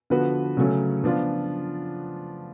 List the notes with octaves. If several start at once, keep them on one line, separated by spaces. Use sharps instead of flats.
D3 F3 B3 F#4 B4
C#3 F#3 A3 C#4
F3 B3 D4 F4